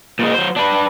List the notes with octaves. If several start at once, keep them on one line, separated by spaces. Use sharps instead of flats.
A#2 G#3
F#3 C5
D4 B4